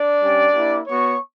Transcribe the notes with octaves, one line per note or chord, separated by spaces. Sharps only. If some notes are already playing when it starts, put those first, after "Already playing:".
Already playing: D4 D5
G3 C#4 G4
A#3 E4 G4
B3 F#4 C#5 C#6